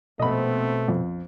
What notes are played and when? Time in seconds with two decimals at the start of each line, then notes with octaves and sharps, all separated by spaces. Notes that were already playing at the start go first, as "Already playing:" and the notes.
0.19 A#1 B2 A3 B3 C4 D#5 B5
0.88 F2